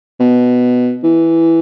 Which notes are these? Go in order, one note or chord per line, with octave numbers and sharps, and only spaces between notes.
B2
E3